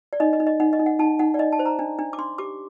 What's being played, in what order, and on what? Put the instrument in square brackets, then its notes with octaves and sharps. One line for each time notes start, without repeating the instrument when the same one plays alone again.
[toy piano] D5
D#4 D#5
D#5
D#4
D#5
D#4 F#5
D#5
D#4
F#5
D#4 A5
D#4 F#5
D5
D#4 D#5
A5
C5
A#5
D4
D4
D6
D4 C6
G4 D6